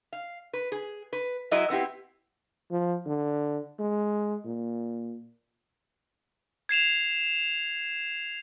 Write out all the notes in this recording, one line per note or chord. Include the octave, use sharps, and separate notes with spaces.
F5
B4
G#4
B4
F#3 G#3 E4 D#5
B3 C4 E4 G4
F3
D3
G#3
A#2
G#6 C7 E7 F7